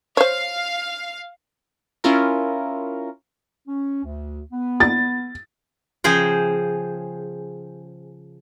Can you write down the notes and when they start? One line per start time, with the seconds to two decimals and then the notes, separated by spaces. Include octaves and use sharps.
0.17 C5 C#5 F5
2.04 C#4 E4 F4 A#4
3.68 C#4
4.04 D2
4.52 B3
4.80 A6
6.04 C#3 F3 G#4 C5 G5